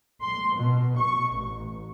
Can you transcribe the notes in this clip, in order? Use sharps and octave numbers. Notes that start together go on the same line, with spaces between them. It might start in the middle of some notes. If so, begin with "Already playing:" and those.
C6
B2
C#6
A1